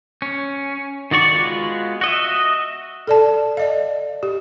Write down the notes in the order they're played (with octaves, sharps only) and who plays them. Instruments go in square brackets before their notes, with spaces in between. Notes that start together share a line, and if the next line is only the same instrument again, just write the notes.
[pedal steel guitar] C#4
D#3 F#4 D5 C#6
G#3 B3 F4 F#4
F#4 D#5 E5
[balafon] A4 D5 A5
D5 D#5 F5
G4